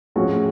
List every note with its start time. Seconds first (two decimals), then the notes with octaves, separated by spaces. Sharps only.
0.16 A2 F3 G#3 C#4 F#4